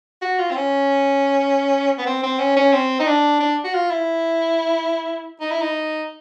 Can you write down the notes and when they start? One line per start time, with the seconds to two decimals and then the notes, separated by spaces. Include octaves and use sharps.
0.22 F#4
0.39 F4
0.51 C4
0.56 C#4
1.98 B3
2.06 C4
2.23 C4
2.39 C#4
2.57 C#4
2.73 C4
3.00 D#4
3.07 D4
3.40 D4
3.64 F#4
3.74 F4
3.91 E4
5.41 D#4
5.52 E4
5.62 D#4